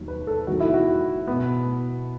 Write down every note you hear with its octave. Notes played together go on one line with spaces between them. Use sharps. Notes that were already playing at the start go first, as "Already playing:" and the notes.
Already playing: D#2 D#3 F#3
B4
A4
E2 D#3 F#3 F#4
E4
F#4
B2 B3